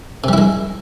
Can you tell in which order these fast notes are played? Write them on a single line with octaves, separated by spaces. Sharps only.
C3 G3 E4 G#3